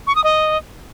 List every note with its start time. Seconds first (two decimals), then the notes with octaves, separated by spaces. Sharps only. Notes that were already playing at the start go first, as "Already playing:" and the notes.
0.07 C#6
0.16 D#6
0.24 D#5